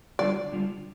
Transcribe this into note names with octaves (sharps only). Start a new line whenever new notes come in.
D3 G3 F4 D5
D3 G3 F4